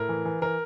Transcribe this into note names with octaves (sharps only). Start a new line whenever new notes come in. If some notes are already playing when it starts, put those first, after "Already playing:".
Already playing: A2 A#4
E3
E3
E3 A#4